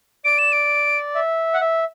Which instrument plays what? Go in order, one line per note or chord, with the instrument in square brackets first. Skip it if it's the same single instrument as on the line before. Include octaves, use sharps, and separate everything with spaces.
[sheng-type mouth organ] D5 [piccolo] D7
[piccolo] E7
D7
[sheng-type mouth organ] E5
F#5
E5